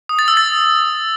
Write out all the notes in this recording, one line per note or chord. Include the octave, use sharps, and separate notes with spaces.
D#6
A6
E6
A6